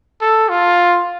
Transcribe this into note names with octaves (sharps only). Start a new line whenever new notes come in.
A4
F4